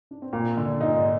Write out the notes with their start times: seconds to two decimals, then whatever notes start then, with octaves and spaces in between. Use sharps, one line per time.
0.11 D4
0.22 C4
0.33 A#2 A#3
0.57 D3
0.81 A#2 D#4
0.94 G#2